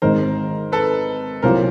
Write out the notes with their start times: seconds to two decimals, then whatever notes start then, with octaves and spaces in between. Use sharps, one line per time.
0.02 G#1 G#2 D#3 A#4 C5
0.72 A4 B4
1.42 C2 A#2 F#3 A#4 C5